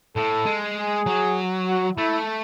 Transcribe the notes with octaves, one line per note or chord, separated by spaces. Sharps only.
A2 A4
G#3
G#4
F#3
F#4
A3 E4